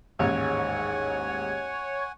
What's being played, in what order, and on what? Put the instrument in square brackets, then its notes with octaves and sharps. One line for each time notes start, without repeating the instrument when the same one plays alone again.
[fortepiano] A1 [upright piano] D#2 G#2 G#3 [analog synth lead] C#5 [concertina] F#5 G#5